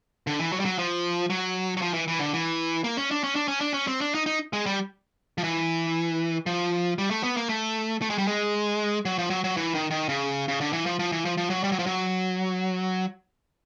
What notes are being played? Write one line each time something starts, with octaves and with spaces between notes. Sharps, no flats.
D3
E3
F#3
G3
F#3
F3
F#3
F#3
F3
E3
E3
D3
E3
A#3
C#4
D4
C#4
D4
C#4
D4
C#4
C4
D4
D#4
D#4
G#3
G3
F3
E3
F3
G3
A3
B3
A#3
A3
A3
G#3
G3
G#3
F#3
F3
F#3
F#3
E3
D#3
D#3
C#3
C#3
D3
E3
F3
F3
E3
F3
F3
F#3
G3
F#3
F3
F#3